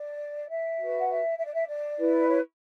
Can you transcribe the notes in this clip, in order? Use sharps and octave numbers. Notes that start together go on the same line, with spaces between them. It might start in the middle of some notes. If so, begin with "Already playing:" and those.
Already playing: D5
E5
F#4 B4
F#5
E5
E5
D5
E5
D5
E4 B4
C#5